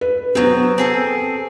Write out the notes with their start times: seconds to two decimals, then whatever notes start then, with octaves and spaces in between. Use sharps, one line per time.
0.01 B4
0.35 F#3 B3 C4
0.78 C4 G#4 A4